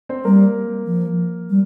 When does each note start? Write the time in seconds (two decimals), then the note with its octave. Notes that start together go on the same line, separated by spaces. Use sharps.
0.09 C4 C5
0.25 G3 A#3 A#4
0.86 F3
1.50 G3